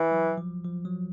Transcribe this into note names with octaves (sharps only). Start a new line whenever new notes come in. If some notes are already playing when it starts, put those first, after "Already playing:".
Already playing: E3
F#3
F3
F3
F#3